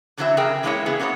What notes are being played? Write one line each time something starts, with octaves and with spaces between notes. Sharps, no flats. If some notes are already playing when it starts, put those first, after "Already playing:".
E2 D3 E3 F#3 C4 E5
C#3 G#4 A#4 D#5 G5
E3 G#3 A#3 C4 E4 C#5
C#3 B3 E4 G#4
F#3 A#3 B3 C5 C#5